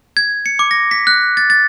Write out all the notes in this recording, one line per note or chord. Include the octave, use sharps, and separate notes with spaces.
G#6
C#7
D6
A#6
B6
F#6
A6
A6